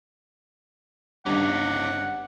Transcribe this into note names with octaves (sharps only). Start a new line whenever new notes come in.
G1 G2 C#4 D#4 F#5 D6